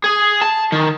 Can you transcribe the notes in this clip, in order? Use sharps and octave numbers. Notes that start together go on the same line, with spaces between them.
G#4
A5
D#3